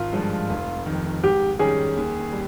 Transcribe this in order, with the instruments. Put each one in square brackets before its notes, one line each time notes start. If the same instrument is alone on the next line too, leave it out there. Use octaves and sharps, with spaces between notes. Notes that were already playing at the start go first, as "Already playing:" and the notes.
Already playing: [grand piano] G#1 [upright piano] F4
[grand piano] G2 F3 G#3
F1
F2 D#3
[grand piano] G#2 [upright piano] G4
[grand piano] D#3 G3 C#4 G4 [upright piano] G#4
[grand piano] D#2
G3